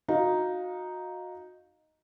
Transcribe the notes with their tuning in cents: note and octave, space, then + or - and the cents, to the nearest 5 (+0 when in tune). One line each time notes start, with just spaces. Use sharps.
D#4 +0 F#4 -25 F5 +10